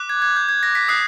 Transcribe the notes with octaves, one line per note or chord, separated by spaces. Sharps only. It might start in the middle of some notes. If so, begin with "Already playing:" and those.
Already playing: D6 F#6
G#6
G#6
G6
G#6
A#6
B6
D#6 F#6 C7